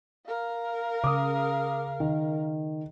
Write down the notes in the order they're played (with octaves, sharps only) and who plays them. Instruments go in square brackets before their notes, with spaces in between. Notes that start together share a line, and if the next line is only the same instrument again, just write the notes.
[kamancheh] A#4 F5
[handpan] C#3 [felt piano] D6 D#6
[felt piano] D#3